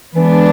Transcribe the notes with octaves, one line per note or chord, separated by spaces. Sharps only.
D3 E3 G#3 B3 D4